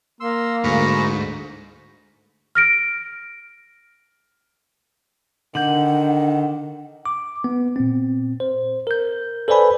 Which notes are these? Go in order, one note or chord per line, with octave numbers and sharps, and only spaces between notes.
A#3 C6 E6
D2 G#2 A#5 B5 C#6
F6 A#6 D7
D3 D#3 D4 F#5 G6
D6
B3
A#2 C4
C5
A#4 G6
A4 B4 C5 D5 G#5 B5